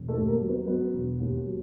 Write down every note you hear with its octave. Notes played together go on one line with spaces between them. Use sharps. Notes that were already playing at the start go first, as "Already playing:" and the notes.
Already playing: E1
A3 A4
D#2
A#3 A#4
F#3
B3 B4
F#3 B3 B4
E1
D#2
F#3